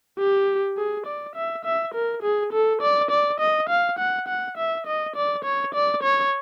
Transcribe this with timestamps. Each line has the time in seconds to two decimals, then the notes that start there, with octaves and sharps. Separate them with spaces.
0.18 G4
0.77 G#4
1.06 D5
1.35 E5
1.65 E5
1.94 A#4
2.23 G#4
2.53 A4
2.81 D5
3.11 D5
3.40 D#5
3.69 F5
3.99 F#5
4.28 F#5
4.57 E5
4.86 D#5
5.16 D5
5.44 C#5
5.74 D5
6.03 C#5